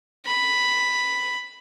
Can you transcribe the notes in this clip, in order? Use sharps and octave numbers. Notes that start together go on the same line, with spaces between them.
B5